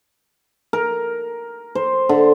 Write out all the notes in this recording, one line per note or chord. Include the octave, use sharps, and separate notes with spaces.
A#4
C5
D3